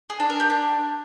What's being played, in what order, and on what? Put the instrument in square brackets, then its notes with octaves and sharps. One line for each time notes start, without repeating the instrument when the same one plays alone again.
[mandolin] G#4
D4
A#4
G4
D4